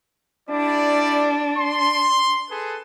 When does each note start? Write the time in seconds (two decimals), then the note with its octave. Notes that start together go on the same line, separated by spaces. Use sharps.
0.50 G3 D4 E4 D5
1.58 C6
2.51 G#4 A4 B4